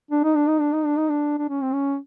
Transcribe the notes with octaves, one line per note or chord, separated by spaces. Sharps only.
D4
D#4
D4
D#4
D4
D#4
D4
D#4
D4
D4
C#4
C4
C#4